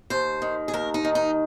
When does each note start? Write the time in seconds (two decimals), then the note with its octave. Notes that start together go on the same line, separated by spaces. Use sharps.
0.10 D#2 C5
0.42 D#3
0.68 G#4
0.73 D#2 A#4
0.94 D#4
1.05 D#3
1.15 D#4